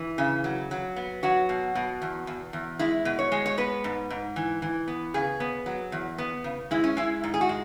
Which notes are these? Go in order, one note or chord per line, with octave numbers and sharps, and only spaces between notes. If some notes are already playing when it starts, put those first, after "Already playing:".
Already playing: E3
C#3
F#3
F#3
B3
F#3 F#4
B2
B2
E2
E2
E2
G#3 E4
B2
C#5
G#3
C#5
B3 B4
G#2
G#2
E3
E3
B3
C#3 G#4
B3
F#3
E2
B3
C#3
G#3 E4
C#4
G#3 E4
G#2
G#4
F#4
G#3